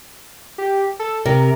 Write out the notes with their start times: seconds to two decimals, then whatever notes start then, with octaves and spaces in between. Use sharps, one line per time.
0.58 G4
0.99 A4
1.26 C3 A#4